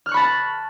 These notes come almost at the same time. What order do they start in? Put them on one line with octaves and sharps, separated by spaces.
F6 F#6 C#6 B5 A5